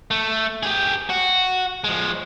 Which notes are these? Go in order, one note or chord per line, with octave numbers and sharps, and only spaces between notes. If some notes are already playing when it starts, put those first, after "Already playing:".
A3
G4 G#4
F#4
F3 G#3